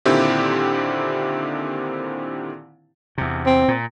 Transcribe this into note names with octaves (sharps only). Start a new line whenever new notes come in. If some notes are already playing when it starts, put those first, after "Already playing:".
A#2 D3 D#3 C4 E4 G4
E2 C3
C4
A#2